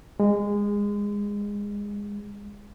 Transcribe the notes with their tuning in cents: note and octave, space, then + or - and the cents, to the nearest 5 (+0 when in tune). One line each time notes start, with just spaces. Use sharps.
G#3 -20